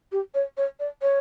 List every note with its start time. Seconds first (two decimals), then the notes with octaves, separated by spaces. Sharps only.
0.12 G4
0.34 C#5
0.57 C#5
0.80 D5
1.02 C#5